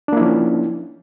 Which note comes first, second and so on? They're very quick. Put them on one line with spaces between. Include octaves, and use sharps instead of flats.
D4 A#3 E4 F3 C#4